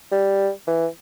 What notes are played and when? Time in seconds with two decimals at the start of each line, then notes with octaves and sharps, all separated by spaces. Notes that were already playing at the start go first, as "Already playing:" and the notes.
0.12 G3
0.67 E3